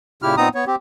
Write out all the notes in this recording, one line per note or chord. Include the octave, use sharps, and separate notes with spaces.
A#2 C#3 E4 G4 F6
A#2 B3 C4 D#4 A#5 D#6
B3 C#5
C4 G4